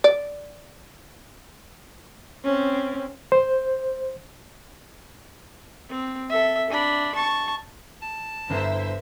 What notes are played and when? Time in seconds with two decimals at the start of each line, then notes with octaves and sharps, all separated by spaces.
0.04 D5
2.45 C4 C#4
3.32 C5
5.89 C4
6.29 A4 E5
6.70 D4 B5
7.15 A5 C#6
8.02 A5
8.50 G1 E4 C5 E5 A#5